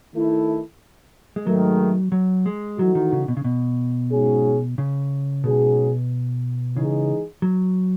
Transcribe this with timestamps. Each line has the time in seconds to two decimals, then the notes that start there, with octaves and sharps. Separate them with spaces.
0.14 D#3 A3 E4
1.36 G#3
1.46 G#2 D#3 F#3 A3
2.12 F#3
2.46 G#3
2.78 E3 F#3 A3 D#4 F#4
2.95 D#3
3.12 C#3
3.28 B2
3.37 C#3
3.44 B2
4.11 G#2 F#3 C#4 G#4
4.78 C#3
5.44 G#2 B2 F#3 C#4 G#4
6.76 C#3 E3 G#3 D#4 G#4
7.42 F#3